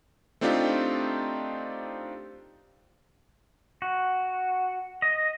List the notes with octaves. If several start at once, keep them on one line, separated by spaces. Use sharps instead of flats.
A3 C4 D4 D#4 F4 G4
F#4
D#5